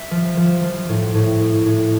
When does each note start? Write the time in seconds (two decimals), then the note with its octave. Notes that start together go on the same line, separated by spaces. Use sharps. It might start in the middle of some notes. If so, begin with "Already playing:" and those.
Already playing: E5
0.11 F3
0.37 F3
0.64 F3
0.89 A2
1.15 A2
1.40 A2
1.66 A2